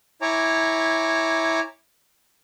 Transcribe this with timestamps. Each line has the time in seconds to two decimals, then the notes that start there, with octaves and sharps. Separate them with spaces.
0.22 E4 C#5 G#5 A#5 D6